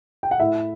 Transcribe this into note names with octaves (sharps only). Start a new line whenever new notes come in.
G5
F#5
A2 E4 E5